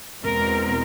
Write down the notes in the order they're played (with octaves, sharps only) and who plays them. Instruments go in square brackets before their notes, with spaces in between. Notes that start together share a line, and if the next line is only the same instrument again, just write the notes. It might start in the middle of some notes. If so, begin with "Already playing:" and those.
[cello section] E2 B2 G#3 C4 A#4